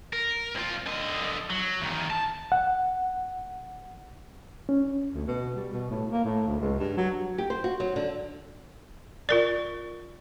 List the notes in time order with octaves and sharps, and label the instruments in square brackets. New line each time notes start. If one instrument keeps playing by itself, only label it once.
[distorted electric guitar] A#4
C2 F4
D3 D#5
F#3
E2 D#3
A5
[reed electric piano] F#5
C#4
[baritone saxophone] D2
B2
G3
B2
A2
A#3
A2
D2
C#2
G2
F#3
[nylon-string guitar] G4
C5
F#4
F#3
D3
[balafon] F4 A#4 D5